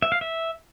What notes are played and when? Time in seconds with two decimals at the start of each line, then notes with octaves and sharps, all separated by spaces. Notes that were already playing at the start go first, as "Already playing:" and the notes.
0.02 E5
0.12 F5
0.21 E5